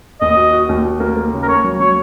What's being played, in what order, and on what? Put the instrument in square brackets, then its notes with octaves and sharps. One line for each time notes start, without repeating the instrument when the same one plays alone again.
[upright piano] D#2 [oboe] D#5
[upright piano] F#4
F#4
D#2
F#4
A#3
A#3
C#3
[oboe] A#4
[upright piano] A#3 [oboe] C#5
[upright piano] F#3
[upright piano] F#3 [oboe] C#5